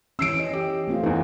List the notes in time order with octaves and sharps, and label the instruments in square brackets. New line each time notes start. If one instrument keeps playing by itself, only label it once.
[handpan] E3 C#4 [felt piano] E6 C7 D7
[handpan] D#5
[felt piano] G4
[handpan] A3 C4 F4
[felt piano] E2 E3 [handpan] D#4